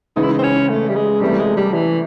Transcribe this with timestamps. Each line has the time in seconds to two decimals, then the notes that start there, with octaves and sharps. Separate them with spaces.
0.16 C#3 E3 G#3 D#4
0.23 E4
0.32 D#4
0.39 C4
0.43 C#4
0.69 A3
0.89 G3
0.96 G#3
1.21 C3 E3 G3 A3
1.39 G#3
1.57 G3
1.73 E3